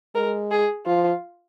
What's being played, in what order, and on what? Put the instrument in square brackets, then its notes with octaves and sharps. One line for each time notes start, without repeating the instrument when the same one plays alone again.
[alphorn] G#3 [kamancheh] A#4
[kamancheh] G#4
[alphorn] F3 [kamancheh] F4